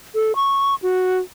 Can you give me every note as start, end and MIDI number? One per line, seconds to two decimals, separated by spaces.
0.15 0.36 69
0.36 0.75 85
0.82 1.19 66